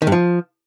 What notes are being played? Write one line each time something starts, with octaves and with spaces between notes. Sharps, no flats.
D#3
G2
F3